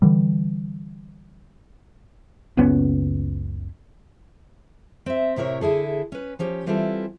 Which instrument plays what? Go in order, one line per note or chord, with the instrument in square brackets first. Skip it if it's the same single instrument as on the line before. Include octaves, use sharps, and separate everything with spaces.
[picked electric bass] D3 E3 G3
[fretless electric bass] F#1 C#2 B3 C#4
[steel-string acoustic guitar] C4 E5
A2 C3 E4 A#4 C#5
D3 E4 G#4 A4
C#4 B4
F3 C#4 G4
E3 G3 C4 E4 F4 A4